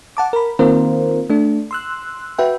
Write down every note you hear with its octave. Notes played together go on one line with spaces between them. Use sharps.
F#5 A5 D6
A#4 B5
D#3 A#3 C4 F4 A#4 C5
A3 D4
C6 E6 F#6
F#4 B4 E5 G5